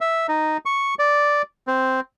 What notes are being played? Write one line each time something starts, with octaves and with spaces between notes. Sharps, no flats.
E5
D#4
C#6
D5
C4